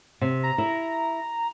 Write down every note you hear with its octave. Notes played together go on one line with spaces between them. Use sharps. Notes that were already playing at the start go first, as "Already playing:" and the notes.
C3
A#5
E4